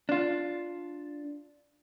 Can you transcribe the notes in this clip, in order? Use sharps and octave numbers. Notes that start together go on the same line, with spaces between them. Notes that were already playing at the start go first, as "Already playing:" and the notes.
D4 F4